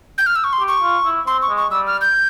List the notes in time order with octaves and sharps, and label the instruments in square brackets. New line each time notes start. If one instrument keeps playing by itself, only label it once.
[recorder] G6
F6
E6
C#6
C6
[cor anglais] G4
[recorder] C#6
[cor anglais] F4
E4
[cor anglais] C4 [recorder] C6
[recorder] C#6
[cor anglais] G#3
[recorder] C#6
[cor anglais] G3 [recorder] E6
[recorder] F6
G6